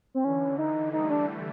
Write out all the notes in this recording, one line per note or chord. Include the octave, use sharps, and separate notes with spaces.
C4
D3 E3 C#4
D#4
G3 A3 D#4
D4